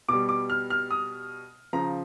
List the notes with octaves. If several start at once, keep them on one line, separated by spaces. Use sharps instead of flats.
B2 G3 D6
D6
F6
F6
D#6
C#3 F3 A#5